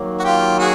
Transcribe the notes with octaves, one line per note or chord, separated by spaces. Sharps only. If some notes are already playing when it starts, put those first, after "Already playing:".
Already playing: D#3 F#3 A#3
F#4
F4 G4
F#4 G#4